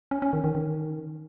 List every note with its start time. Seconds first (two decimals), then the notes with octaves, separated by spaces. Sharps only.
0.11 C#4
0.22 C#4
0.33 D#3
0.44 D#3
0.55 D#3